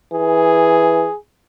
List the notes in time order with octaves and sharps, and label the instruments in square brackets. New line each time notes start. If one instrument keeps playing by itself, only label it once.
[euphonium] E3 [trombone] G#4